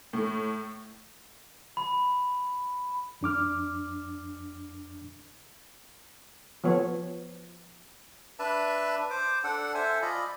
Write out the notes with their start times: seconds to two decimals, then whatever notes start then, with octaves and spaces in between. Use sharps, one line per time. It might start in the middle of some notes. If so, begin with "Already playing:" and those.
0.13 A2
1.77 B5
3.21 F2 D4 D6 F6
6.64 F3 B3 C#5
8.39 D4 B4 E5 A5
9.10 C5 D6
9.44 D4 A4 F#5
9.74 A4 C5 E5 G#5
10.02 F4 D5 D#5 B5